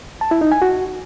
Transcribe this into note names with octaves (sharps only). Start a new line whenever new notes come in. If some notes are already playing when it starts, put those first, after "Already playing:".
A5
E4
D#4
G#5
F#4